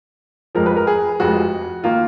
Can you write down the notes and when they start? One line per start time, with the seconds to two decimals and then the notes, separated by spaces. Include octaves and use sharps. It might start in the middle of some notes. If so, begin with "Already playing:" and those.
0.55 F1 F2 F3 G#3 A#4
0.66 B4
0.76 A#4
0.87 G#4
1.20 F1 F2 F3 G#3 F#4
1.84 D#3 A#3 F4